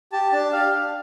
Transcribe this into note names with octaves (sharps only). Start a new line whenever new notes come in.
G4 A5
D4 A5
G4 F5
D4